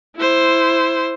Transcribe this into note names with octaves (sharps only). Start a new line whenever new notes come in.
E4 C5